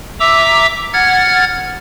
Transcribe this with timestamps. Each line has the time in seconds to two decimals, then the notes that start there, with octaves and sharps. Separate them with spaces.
0.20 E5 A#5 D6 E6
0.93 F#5 F6 G#6 A6